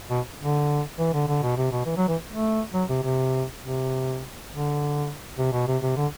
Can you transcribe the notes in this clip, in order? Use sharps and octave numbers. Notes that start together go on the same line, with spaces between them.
B2
D3
E3
D3
D3
B2
C3
B2
E3
F#3
E3
A3
F#3
C3
C3
C3
D3
C3
B2
C3
C3
D3